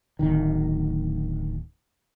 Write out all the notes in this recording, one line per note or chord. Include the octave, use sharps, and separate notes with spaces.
D1 D#3